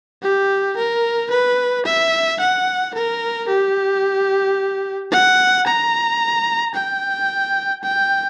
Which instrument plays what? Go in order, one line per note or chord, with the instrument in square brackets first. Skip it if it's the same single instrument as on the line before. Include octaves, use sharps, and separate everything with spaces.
[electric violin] G4
A#4
B4
E5
F#5
A#4
G4
F#5
A#5
G5
G5